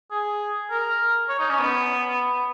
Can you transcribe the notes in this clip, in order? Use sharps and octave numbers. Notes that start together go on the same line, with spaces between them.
G#4
A#4
C#5
D#4
C#4
B3